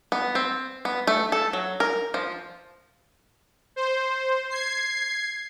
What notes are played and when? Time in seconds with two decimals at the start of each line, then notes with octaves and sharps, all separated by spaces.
0.12 B3
0.35 C4
0.85 B3
1.07 A3
1.32 A4
1.53 F#3
1.80 A#4
2.14 F3
3.76 C5
4.49 G#6 C7